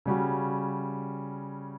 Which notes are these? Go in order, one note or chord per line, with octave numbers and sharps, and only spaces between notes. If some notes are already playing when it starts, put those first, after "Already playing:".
C#3 G3 C#4 F#4